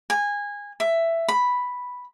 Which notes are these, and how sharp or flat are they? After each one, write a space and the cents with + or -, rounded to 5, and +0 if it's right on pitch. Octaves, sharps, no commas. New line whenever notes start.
G#5 -20
E5 +10
B5 +0